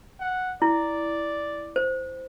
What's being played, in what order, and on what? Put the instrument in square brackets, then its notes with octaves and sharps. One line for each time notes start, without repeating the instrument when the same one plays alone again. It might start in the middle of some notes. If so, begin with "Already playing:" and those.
[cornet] F#5
[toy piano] E4 [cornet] D5
[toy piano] C5